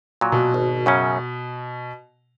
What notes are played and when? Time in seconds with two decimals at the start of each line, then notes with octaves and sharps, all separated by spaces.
0.21 A#2 F#3
0.32 B2
0.54 G#1
0.86 F#2 C#3 F#3 C#4